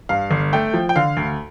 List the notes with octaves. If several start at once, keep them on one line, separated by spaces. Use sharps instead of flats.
G2 F5
G1
A3 G5
F3
G5
D3 F5
D2